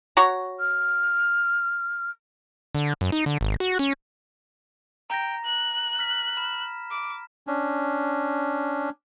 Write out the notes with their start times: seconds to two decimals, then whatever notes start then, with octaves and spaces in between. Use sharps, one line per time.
0.17 F#4 C#5 A#5
0.59 F6
2.75 D3
3.01 F#2
3.12 D#4
3.26 D3
3.41 G#1
3.60 F#4
3.79 C#4
5.10 G5 A#5 A#6
5.45 F#6
5.99 F6 A#6 B6
6.37 B5 F6 E7
6.91 D6
7.47 C#4 D4